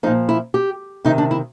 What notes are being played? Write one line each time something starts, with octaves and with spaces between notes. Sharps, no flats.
A#2 F3 D#4
E4
G4
C3 D#3 D#4
D4
E4